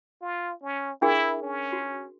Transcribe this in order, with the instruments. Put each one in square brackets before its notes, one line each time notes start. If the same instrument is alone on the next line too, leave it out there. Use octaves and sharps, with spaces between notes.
[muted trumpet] F4
C#4
[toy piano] D4 G#4 A#4 [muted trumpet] E4
[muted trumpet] C#4
[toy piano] F#4